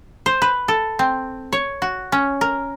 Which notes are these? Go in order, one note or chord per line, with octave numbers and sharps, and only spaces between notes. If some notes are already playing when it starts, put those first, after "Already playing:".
C5
B4
A4
C4
C#5
F#4
C#4
A#4